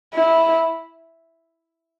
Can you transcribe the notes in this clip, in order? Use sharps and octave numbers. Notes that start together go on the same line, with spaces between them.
E4